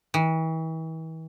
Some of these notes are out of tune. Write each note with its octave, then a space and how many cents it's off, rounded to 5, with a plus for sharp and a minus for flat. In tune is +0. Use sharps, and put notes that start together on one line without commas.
E3 -40